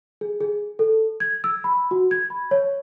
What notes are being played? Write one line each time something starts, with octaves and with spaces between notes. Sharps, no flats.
G#4
G#4
A4
G#6
E6
B5
F#4
G#6
B5
C#5